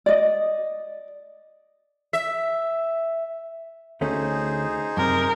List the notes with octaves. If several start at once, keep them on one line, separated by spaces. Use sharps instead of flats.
D5 D#5
E5
D2 A3 C#4 D#4 G#4 C5
F#2 C3 A#4